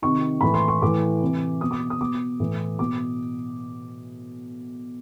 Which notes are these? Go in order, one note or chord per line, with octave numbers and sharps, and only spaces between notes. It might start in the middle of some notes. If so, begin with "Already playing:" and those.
C3 D#3 C#6
A2 E3 B5
C6
C#6
A2 E3 D6
C3 E3
B2 D#6
D6
D#6
B2 D6
A2 E3
B2 D6